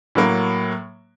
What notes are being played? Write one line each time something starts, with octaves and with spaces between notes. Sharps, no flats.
A2 F#3 A#3